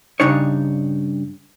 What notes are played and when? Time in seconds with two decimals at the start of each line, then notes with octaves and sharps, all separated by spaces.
0.20 G2 C#3 D4 D#4 C#5